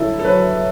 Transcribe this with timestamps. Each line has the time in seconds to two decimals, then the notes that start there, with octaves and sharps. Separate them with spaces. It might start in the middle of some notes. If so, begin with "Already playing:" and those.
Already playing: F#3 E4 A4
0.19 A4
0.25 F#3 B4